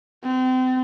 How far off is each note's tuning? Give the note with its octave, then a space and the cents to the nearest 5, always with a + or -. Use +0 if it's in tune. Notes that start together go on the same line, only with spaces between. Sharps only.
C4 -35